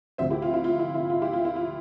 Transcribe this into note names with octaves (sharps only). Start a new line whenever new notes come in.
D2 C3 F3 C5 E5
E4 G4
F4
E4
F4
E4
E4
F4
E4 G4
F4
E4
F4